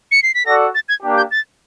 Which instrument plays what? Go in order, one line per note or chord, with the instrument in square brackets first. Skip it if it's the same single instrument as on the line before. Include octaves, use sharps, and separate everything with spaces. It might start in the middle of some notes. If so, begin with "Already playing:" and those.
[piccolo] C#7
C7
B6
[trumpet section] F#4 A4 D5 F#5 [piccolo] A#6
[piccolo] A6
G#6
[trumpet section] A#3 D4 G4
[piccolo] G6
A6